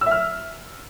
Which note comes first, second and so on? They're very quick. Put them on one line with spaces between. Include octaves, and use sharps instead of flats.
E6 E5 F6